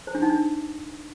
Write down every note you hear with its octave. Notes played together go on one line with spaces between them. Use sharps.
C5
D4
D#4
D4